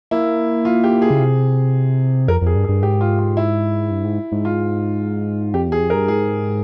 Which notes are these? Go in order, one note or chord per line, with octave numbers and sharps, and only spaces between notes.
A#3 E4
F4
G4
G#4
C#3
C3
F2 A#4
F2 G#4
G2
G#4
G2
G#2 G4
F4
F4
E4
G2
G#2
G#2
F4
F2 G4
E2 G#4
F2
A#4
G2
G#2 G#4